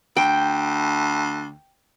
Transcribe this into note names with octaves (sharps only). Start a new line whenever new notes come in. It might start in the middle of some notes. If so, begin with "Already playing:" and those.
D2 G5